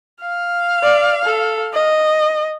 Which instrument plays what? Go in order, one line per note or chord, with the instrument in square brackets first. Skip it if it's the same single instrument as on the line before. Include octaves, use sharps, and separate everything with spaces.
[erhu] F5
[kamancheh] D5
A4
D#5